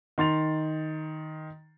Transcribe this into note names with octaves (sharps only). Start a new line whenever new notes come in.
D#3 C6 A6 F7